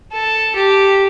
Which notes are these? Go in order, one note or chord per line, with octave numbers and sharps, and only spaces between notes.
A4
G4